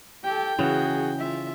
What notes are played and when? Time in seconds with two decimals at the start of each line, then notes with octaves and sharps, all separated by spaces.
0.24 G4 A4 G5
0.59 C#3 E3 F#4 G#4
1.19 F4 E5